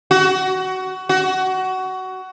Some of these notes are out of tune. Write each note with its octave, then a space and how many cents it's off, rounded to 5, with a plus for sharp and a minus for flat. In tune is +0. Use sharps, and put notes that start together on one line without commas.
F#4 +20
F#4 +20